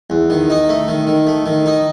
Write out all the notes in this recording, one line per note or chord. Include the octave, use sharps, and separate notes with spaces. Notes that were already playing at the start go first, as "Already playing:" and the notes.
E2
D#3
D#4
A3
D#3
D#3
A3
D#3
D#4